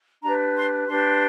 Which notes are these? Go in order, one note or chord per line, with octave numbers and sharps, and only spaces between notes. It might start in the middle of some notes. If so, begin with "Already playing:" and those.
D4 G4 B4 A#5
C6
D4 G4 B4 C6